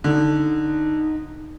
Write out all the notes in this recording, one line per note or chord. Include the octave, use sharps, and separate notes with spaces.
D3 D#4